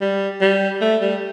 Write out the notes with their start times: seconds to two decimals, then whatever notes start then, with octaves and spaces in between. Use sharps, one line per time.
0.01 G3
0.41 G3
0.81 A3
1.01 G3